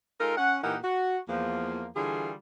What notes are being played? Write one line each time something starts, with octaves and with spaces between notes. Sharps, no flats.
G#3 D#4 F4 A4 A#4
C#4 F#5
A#2 E3 D#4 G4 A#4 F#5
F#4
E2 F3 A#3
D3 E3 G3 F4 G#4